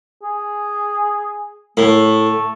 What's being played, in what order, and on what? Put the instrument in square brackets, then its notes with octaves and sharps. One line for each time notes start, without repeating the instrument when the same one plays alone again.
[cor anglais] G#4
[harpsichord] A2 [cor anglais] A3